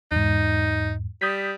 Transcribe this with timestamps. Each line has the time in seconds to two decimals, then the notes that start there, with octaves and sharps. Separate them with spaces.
0.12 E2 G#2 D#4
1.21 G3 D#6 G6 B6